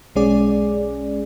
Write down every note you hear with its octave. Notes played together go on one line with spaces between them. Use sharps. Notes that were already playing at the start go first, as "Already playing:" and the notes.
B1 G#3 C#4 G#4 D5